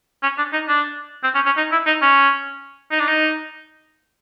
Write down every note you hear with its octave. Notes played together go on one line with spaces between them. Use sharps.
C#4
D4
D#4
D4
C4
C#4
C#4
D#4
E4
D#4
C#4
D#4
D4
D#4